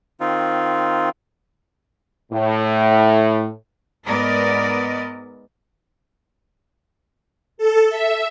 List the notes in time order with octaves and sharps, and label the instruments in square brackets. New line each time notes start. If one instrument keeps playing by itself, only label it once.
[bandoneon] D#3 C4 D#4 F4
[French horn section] A2
[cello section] G#2 B3 A#4 D5 D#5
[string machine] A4
E5